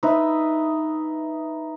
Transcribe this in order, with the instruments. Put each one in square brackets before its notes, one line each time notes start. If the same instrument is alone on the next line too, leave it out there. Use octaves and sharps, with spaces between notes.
[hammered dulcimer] D#4 B4 D#5 E5